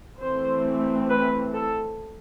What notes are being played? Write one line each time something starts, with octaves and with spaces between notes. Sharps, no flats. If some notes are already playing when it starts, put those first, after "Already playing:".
E3 A3 C4 C5
B4
A4